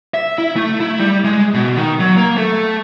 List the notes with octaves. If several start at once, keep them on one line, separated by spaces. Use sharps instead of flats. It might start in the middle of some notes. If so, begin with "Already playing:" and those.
E5
E4
A3
E4
G3
G#3
B2
D#3
F#3
A#3
A3